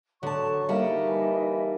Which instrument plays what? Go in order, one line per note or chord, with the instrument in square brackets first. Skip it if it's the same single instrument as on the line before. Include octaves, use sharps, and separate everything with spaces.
[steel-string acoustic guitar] D3 A5 [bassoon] F#3 [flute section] C#6
[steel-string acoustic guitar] G3 F#5 A5 [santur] A#3 D6 [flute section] D#4 D#5 E5
[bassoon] E3